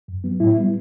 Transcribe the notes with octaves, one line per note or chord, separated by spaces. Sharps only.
F#2
F#3 B3
A2 E4
G3 B3